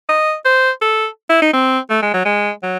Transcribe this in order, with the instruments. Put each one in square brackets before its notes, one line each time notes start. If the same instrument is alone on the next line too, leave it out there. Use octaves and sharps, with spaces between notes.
[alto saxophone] D#5
C5
A4
E4
D#4
C4
A3
G#3
F#3
G#3
F#3